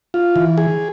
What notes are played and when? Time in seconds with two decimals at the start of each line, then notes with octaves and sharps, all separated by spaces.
0.14 F4
0.36 E3
0.58 G#4